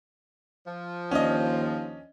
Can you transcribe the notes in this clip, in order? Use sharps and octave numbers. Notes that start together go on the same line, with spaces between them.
F3
D#2 C#4 D4 D#5